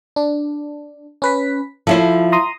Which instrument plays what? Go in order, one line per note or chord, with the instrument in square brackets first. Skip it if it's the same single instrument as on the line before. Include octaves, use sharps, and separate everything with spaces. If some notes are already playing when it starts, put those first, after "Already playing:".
[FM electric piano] D4
C#4 B4 B6
[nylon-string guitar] F3 E4 C5 [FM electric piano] A4
[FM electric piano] A#5 C6 D#6